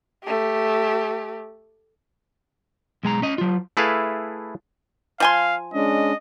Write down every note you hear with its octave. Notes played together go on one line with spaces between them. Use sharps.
A3 G4
B1 G#3 G#5 A#5
C#4 D#5
F#3 F4
A3 E4 G#4 A4 B4 F5
F3 F5 G#5 C6
G#3 C#4 D4 D#5